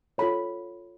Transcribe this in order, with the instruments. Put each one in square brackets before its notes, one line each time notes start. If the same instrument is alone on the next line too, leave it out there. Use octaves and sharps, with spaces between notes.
[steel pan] F4 A4 C#5 B5